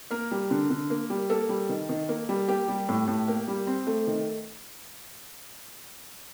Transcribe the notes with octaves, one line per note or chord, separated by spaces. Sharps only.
A#3 A#4
G3
D3
D3
A#3
G3
A#3 A4
G3
D#3
D#3
A#3
G3
A#3 G4
G3
A2
A2
A#3
G3
C4
A3
D#3